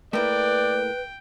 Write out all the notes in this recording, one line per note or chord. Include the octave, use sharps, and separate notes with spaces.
A3 A#3 E4 B4 D5 G5